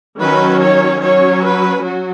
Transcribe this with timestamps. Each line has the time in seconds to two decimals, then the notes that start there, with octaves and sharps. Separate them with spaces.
0.19 D#3 F#3 C#4 B4
0.61 C#5
1.01 F#3 C#4 C#5
1.43 B4
1.84 F#3 F#4